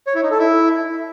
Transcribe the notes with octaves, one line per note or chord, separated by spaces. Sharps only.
C#5
E4
D#4
A4
E4